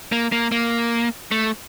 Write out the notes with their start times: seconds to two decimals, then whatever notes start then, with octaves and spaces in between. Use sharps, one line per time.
0.12 A#3
0.32 A#3
0.52 A#3
1.31 A3